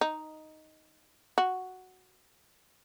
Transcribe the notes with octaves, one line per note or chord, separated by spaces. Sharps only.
D#4
F#4